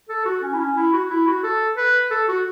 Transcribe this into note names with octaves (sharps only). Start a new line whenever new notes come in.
A4
F#4
C#4
E4
C#4
E4
F#4
E4
F#4
A4
B4
A4
F#4